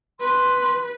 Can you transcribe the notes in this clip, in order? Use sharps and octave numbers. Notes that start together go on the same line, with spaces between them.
B4 C6